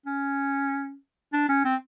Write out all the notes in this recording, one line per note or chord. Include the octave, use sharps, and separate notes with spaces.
C#4
D4
C#4
C4